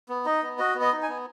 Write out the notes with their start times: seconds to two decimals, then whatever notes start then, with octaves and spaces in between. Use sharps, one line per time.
0.09 B3
0.25 D#4 D#5
0.42 B3
0.58 F#4 D#5
0.75 B3
0.81 D#5
0.93 D#4
1.02 G#5
1.08 B3